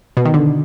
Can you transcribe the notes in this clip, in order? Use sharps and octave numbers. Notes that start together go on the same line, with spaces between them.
B2
D#3
D3